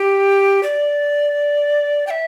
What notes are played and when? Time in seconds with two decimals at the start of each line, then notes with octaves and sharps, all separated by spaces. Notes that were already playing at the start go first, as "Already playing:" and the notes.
Already playing: G4
0.63 D5
2.07 G5
2.10 E5